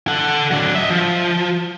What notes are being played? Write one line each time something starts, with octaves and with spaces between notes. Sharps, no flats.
A4 F#5
F#3 D4
D#5 E5
F3